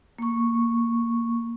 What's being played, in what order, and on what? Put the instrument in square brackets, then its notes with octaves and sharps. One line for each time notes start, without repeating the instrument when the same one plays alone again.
[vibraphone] A#3 C#6